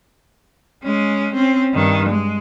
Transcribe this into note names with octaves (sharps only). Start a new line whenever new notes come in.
G#3 C#4
C4 C#4
G2 D#3
G#3